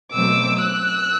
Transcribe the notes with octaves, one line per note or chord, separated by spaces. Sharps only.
B2 F#3 A3 C4 D6 E6
E6 F#6